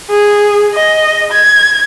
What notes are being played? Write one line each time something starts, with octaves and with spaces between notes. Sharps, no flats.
G#4
D#5
G#6